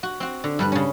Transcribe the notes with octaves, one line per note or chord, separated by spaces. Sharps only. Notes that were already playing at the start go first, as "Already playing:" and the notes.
F#4
C4 F#4
D3
G2 G3 B4
C#3 C#4